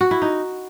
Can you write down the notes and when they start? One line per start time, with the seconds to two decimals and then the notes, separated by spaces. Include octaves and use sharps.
0.01 F#4
0.11 E4
0.22 D#4